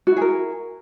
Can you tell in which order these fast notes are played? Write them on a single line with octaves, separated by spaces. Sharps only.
F#4 E4 G#4 A#4